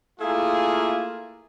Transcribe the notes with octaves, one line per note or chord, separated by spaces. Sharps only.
A3 A#3 E4 F4 G#4